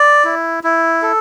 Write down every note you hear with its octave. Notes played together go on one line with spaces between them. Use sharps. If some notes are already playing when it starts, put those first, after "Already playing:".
Already playing: D5
E4
E4
A4